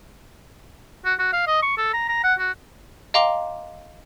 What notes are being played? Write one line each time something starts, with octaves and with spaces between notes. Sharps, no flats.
F#4
F#4
F5
D#5
C#6
A4
A#5
A#5
F#5
F#4
D#5 F5 G5 A#5 C6 D6